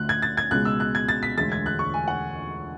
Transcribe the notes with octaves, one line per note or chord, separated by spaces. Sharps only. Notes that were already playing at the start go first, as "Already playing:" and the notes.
Already playing: D2 D3 A3 F#6
G#6
A6
G#6
C#2 B2 G#3 F#6
E6
F#6
G#6
A6
B6
E1 D2 D3 G#3 A6
G#6
F#6
C#6
G#5
F#5